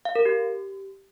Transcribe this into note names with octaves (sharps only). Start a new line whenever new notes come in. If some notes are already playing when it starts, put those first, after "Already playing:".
F5
A#4
G4